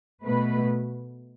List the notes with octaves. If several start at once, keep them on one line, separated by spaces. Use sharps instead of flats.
B2 A3 B4